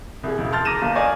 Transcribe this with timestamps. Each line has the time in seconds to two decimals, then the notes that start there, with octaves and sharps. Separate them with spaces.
0.23 C2 G#4
0.38 E1 C#2
0.52 A5 C6 F6 G6 A6
0.65 A#5 D6 F6 A#6 D#7 E7
0.82 G1 A#3
0.95 A#4 D5 D#5 F5 G#5 C#6